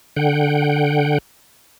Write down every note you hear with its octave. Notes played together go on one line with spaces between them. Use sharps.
D3 F#5 G5